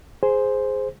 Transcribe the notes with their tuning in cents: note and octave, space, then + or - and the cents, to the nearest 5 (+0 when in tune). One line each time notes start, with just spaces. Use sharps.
G#4 +0 C5 +0